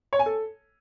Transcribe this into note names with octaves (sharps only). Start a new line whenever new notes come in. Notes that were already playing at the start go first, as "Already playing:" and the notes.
C#5
G#5
A4